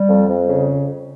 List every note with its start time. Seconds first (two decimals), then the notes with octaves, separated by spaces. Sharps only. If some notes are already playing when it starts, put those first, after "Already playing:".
Already playing: G3
0.08 F2
0.28 F2
0.48 C#3